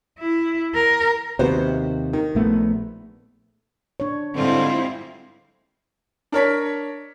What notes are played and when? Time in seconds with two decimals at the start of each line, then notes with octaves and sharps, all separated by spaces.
0.19 E4
0.74 A#4
1.39 D#2 C3 B3 F#4 C5
2.13 D#3
2.35 A#1 A3 B3
4.00 D4 C#5
4.36 G#2 D3 G3 C4 E4 F4
6.32 D4 A#4 C#5 B6